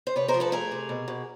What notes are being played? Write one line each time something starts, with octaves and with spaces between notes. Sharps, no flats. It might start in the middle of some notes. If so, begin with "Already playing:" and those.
C5
C3 B4 C#5
A#4 C5
F3
A4 B4
A3 G#4 A#4
C3
B2
B2